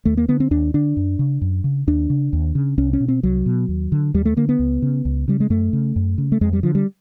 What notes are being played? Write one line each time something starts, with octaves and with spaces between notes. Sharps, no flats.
D#2 A3
A#3
D3 B3
C4
D#2 D4
D3 D4
F#2
C#3
F#2
C#3
D#2 D4
C#3
D#2
C#3
C2 C#4
C#4
B2
C4
C2 F#3
B2
D#2
D3
D#2 G3
A3
D3 A#3
B3
C#2
C#3
C#2
C#3 G3
G#3
F#2 A3
C#3
F#2
C#3
A3
F2 G#3
G3
D3 F3
G3